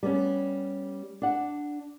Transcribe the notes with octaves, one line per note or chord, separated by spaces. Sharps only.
G3 B3 C#4
D4 F#5